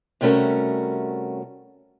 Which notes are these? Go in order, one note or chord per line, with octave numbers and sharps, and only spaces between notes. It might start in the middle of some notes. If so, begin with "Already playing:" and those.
C3 G3 A3 C#4 F#4 A#4